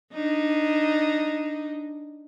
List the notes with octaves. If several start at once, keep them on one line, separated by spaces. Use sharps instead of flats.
D4 D#4